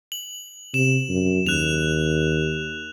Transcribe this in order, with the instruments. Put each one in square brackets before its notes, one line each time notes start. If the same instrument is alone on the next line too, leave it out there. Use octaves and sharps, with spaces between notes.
[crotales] F#7
[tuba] C3 [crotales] E7
[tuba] F#2
[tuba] D#2 [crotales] F#6 F7